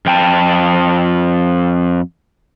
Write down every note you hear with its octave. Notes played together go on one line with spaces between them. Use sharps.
F2 G5 A5